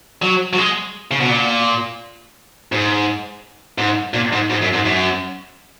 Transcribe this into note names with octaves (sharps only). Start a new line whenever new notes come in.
F#3
F#3
G#3
C#3
B2
A#2
G#2
G#2
A#2
G#2
G#2
F#2
G#2
F#2